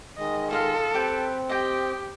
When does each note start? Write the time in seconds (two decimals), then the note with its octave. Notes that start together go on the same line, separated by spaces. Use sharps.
0.18 D#3 G#3 D#5
0.51 F4 A4 D#5 F5
0.94 C4 G4 B4 G5
1.49 G4 D#5 G5